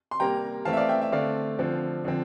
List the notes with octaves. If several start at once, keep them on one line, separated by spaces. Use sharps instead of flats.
C6
C3 G3 A#3 G5 A#5
E3 A3 C4 F5 A5
E5
D5 F5
E5 G5
E5
D3 A3 C4 D5 F5
D3 F3 C4
D3 F3 C4